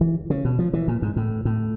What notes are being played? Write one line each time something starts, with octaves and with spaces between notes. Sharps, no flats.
E3
C#3
B2
F3
E3
A#2
G#2
A2
A2